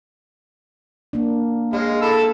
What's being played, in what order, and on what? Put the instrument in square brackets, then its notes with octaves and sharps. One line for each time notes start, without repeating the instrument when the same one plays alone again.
[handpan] A#3 D4
[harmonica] G#3 [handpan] G#4 C#5 F5
[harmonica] A4 B5 E6